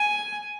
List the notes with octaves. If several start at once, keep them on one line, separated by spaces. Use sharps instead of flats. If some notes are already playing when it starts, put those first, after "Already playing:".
Already playing: G#5